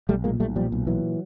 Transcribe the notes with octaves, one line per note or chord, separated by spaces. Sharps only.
B1 G3 A3
A#2 G#3 A#3
B1 G3 A3
A#2 F3 G3
B1
A#2 E3 F#3